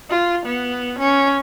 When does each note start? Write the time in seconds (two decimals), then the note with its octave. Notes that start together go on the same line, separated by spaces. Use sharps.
0.10 F4
0.46 B3
0.99 C#4